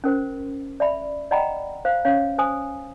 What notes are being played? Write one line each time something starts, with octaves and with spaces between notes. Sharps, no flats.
C#4 A#4 C5
D5 E5 B5
D5 D#5 F#5 G5 A#5 B5
C5 F5
C#4 C#5 F5
C5 G#5 D#6